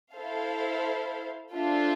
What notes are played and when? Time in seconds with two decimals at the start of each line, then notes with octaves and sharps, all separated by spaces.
0.14 E4 A4 C5 F5
1.53 D4 F4 A4 C5 E5